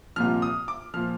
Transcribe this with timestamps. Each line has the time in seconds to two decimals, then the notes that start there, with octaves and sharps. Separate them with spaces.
0.16 C2 A#2 F3 F6
0.42 D#6
0.68 D6
0.94 A#2 F3 F6